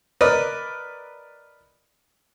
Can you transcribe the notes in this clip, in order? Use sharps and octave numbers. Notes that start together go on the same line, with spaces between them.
A#4 B4 D5 D#5